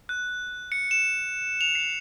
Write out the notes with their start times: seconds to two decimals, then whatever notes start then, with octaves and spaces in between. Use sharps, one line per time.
0.09 F#6
0.72 C#7
0.91 E7
1.61 F7
1.75 C7